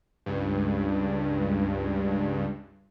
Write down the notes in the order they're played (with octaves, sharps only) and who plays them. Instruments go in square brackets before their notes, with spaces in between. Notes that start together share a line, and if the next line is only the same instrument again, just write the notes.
[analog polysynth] C#2 G2